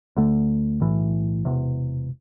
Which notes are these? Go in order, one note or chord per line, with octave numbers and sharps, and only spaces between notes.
D2 D3 A3
B1 A2 E3
E1 E2 C3